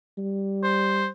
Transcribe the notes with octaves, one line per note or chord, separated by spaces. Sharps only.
G3
C5